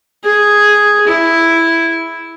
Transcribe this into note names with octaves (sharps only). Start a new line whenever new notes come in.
G#4
E4